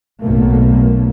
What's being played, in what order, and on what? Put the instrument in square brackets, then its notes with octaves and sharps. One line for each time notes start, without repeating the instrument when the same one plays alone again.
[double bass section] B1 B2 A3 A#3